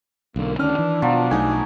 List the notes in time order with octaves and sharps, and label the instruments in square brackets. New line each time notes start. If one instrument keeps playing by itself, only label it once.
[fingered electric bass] B1 D3 [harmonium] A#3
[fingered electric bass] D2 C#4 [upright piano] D#3 F6 [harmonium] D4
[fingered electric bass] E3
[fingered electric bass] B2 [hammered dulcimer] F3 F#3
[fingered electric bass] B1 [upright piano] A3 D#4 [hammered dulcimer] G#5